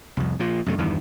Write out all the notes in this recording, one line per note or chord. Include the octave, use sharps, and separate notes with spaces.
C2 F2
A#2 F3
F#2 C3 A3
E2 G2 D#3 E3